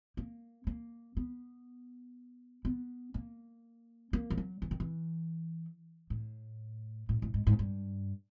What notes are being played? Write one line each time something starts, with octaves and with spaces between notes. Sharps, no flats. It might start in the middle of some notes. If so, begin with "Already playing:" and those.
A#3
A#3
B3
B3
A#3
A#3
F3
F#3
E3
D#3
E3
A2
A2
A2
G#2
G#2
G2